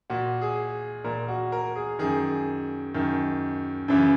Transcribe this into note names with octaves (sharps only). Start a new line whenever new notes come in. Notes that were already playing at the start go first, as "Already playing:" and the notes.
A#2 F#4
G#4
A#2 A#4
F#4
A#4
G#4
F#2 D#3 G#4
F#2 D#3
F#2 C#3 E3